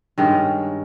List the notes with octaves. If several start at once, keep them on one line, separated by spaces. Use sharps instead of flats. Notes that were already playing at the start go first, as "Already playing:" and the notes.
G2 D#3 G#3 C#4